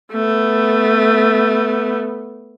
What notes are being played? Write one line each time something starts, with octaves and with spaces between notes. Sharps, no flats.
A3 B3